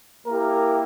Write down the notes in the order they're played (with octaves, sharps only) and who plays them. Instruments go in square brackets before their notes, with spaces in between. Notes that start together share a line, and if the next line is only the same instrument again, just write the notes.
[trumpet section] A#3 E4 G4 A#4